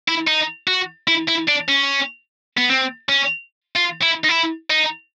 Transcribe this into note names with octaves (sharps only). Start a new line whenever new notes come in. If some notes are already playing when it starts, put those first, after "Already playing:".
E4
D#4
F#4
E4
E4
D4
C#4
B3
C4
C#4
F4
E4
D#4
E4
D#4